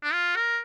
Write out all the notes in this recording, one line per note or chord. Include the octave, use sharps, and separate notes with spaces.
D4
F4
A#4